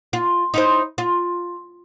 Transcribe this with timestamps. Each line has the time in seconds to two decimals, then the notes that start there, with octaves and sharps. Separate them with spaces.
0.13 F4
0.54 D#4 E4 C5
0.98 F4